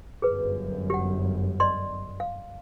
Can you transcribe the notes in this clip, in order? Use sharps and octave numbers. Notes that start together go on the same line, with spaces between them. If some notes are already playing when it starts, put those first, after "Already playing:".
G1 F#2 G#4 B4
G4 F#5
D5 D#5 C6
F5